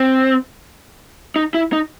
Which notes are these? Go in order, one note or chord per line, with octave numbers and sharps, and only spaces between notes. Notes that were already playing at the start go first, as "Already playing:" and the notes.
Already playing: C4
D#4
E4
D#4